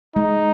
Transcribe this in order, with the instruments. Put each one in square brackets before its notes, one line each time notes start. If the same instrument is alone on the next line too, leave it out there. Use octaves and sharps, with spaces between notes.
[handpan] G#3 [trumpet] D#4